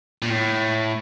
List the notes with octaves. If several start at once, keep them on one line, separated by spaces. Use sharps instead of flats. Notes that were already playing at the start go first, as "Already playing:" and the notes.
A#2
A2